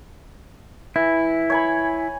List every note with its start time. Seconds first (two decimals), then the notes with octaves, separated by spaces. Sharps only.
0.96 E3 E4
1.50 C#5 G#5 B5